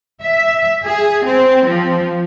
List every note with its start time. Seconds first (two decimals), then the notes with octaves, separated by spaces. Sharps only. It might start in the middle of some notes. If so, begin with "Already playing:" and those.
0.23 E5
0.85 G#4
1.26 C4
1.67 F3